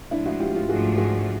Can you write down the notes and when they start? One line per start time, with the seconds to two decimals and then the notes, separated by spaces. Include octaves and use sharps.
0.11 A2 F3 G#3 D4 E4
0.25 E4 F#4
0.40 F4 G4
0.55 F4 G4
0.69 G#2 F3 A3 D4 F#4 G#4
0.97 F#4 G#4